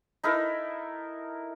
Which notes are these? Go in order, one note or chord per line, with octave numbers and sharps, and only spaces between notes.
D#4 E4 A4 A#4